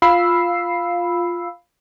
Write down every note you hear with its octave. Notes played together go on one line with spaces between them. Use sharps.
F4 F5 B5 E6 C7